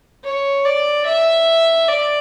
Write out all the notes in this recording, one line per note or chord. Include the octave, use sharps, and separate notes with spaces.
C#5
D5
E5
D5